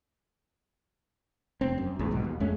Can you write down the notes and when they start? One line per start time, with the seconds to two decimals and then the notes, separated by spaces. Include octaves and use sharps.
1.61 F1 C4
1.78 F#2
1.99 B1 E2 A2
2.11 B1 G#2 B2
2.24 D#2
2.40 F2 G#3 A3 C#4